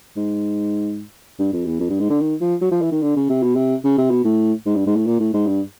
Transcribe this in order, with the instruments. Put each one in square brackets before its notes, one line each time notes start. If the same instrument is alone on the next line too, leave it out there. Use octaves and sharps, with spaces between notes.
[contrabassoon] G#2
G2
F2
E2
F2
G2
G#2
D3
D#3
F3
F#3
F3
E3
D#3
D3
C#3
C3
B2
C3
C#3
C3
B2
A2
G#2
G2
G#2
A2
A#2
A2
G#2
G2